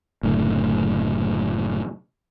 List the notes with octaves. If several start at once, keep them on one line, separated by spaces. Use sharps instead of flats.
F#1 A2 D3